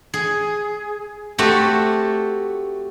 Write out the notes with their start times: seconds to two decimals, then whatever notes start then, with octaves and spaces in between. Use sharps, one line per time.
0.14 G#4
1.38 A3 C4 F#4 G4